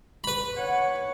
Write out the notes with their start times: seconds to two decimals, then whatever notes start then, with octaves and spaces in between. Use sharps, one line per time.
0.24 B4 B5
0.57 C#5 F#5